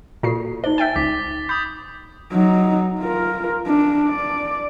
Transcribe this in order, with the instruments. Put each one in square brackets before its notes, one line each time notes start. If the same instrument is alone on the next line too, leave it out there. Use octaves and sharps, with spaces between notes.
[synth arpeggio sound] A#2 F#4 C7 [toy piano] F4 A4
[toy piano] D#4 C5 [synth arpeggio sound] D5 [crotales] G7
[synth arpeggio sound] E5 G5 G#5 [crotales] A6
[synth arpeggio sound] C#2 [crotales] D6 B6
[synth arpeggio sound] B5 [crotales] D6 D#6 G6
[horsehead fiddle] F#3 D#4
F4 A#4
D4
D5